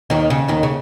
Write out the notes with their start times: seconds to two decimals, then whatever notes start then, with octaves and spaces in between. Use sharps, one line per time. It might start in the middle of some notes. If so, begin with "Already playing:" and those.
0.10 D#2 D#3
0.30 C#3
0.48 D#2 D#3
0.63 C#3